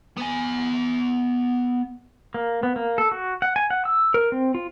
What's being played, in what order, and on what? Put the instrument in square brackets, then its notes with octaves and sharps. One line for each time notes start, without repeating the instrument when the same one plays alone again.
[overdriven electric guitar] B3 G#5
[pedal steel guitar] A#3
B3
A#3
A4
F#4
F#5
G#5
F#5
E6
A#4
C4
F4